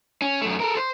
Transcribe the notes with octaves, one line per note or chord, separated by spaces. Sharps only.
C#4
F#2 A3
A4 A#4
C5